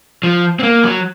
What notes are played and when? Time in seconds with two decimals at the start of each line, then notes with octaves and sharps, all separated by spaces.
0.23 F3
0.60 C4
0.63 A#3
0.84 F#3